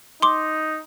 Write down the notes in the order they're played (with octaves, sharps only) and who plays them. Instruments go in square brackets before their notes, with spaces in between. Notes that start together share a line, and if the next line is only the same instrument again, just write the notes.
[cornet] D#4 [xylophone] C6 D6